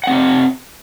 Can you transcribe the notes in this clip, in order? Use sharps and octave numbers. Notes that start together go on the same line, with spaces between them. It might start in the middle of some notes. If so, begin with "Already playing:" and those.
C4 G4 F#5